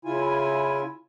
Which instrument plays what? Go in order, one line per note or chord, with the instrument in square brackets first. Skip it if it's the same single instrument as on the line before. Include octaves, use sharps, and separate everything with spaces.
[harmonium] C#3 E4 F4 G#5